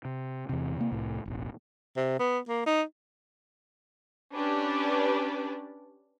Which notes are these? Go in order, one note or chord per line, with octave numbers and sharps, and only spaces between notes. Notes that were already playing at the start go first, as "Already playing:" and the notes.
C3
E2 C3
C3 A#3
C2 A2
E1 A1
C3
B3
A#3
D#4
C#4 D4 G4 B4 D5